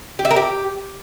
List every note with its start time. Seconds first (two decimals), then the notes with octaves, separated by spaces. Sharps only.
0.19 G4
0.25 E5
0.31 A#4
0.36 G4